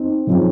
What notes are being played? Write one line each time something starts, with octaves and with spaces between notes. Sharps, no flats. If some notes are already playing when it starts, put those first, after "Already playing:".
Already playing: C4 D#4
C#3 F3 C4 D#4